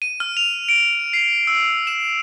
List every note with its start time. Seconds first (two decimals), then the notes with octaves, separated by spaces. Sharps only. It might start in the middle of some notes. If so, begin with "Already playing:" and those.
0.02 D#7
0.20 F6
0.37 F7
0.69 D7
1.13 C7
1.47 E6
1.87 E7